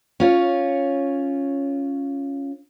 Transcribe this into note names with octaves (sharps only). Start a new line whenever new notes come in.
C#4 F4 C#5